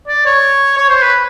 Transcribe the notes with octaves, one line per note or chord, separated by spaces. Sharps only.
D5
C#5
C#5
C5
B4